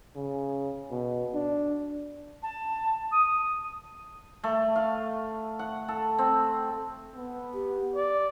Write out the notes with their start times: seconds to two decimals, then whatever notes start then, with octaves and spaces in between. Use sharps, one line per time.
0.15 C#3
0.91 B2
1.35 D4
2.42 A5
3.11 D#6
4.44 A3
4.75 F5
5.59 F#5
5.88 A4
6.18 C4
7.16 B3
7.54 G4
7.95 D5